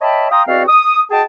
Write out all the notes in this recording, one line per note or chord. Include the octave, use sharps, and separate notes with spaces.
C#5 D#5 E5 G5 A5 B5
F5 G5 A#5 C6 D#6
E2 C4 F#4 D5 D#5 F5
D#6
F#4 G#4 D#5 G5 A5